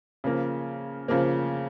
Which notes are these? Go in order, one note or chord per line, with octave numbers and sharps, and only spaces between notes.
C#3 F3 A#3
C#3 F3 A#3